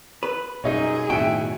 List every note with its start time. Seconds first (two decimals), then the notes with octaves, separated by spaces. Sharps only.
0.23 B4
0.64 F#2 B2 G3 D#4 G#4 C#5
1.10 B1 F#2 A2 D#3 F#4 E5 G5